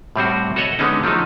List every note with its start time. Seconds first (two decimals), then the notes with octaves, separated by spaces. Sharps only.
0.16 A2 G3 C4 F#4
0.56 F#4 A4 C#5 D#5 E5 F#5
0.79 D3 G#3 B3 C#4 D#4
1.03 F3 F#3 A3 D#4